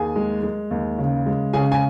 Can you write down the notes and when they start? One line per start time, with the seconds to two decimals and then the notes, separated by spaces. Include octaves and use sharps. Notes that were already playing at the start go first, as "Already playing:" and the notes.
Already playing: D#2 G#4 G#5
0.16 G#3
0.43 G#3
0.71 D#2
0.98 C#3
1.26 G#3
1.53 C#3 G#4 G#5
1.72 G#5